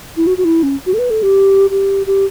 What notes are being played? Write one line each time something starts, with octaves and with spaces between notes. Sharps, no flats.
E4
F#4
F#4
E4
C#4
F#4
A4
B4
A4
G4
G4
G4